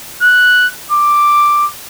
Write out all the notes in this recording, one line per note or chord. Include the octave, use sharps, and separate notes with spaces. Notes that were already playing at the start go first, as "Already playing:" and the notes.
F#6
D6